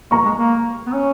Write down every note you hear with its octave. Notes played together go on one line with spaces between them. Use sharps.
A#3 A#5 C#6
G#3
A#3
B3
C#4